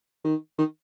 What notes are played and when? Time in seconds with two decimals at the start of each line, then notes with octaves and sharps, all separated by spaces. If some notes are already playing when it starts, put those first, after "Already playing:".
0.24 D#3
0.58 D#3